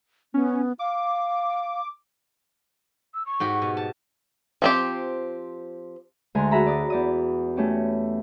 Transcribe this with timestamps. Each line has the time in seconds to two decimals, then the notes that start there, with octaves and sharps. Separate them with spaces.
0.34 B3 C#4
0.79 F5 D6
3.14 E6
3.26 C#6
3.40 G#2 F#4 G4
3.62 B2
3.77 A5
4.62 F3 C4 G4
6.35 D2 D3 G#3 G#5 A#5 C6
6.51 F#4 G#4 E5 A#5 B5
6.66 D5 D#6
6.90 E2 D5 D#6
7.56 A3 C#4 G4